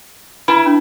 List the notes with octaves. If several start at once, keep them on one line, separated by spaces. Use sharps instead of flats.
E4 B4 A5 B5
D4